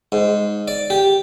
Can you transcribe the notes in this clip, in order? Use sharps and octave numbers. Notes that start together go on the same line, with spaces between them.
G#2
D5
G4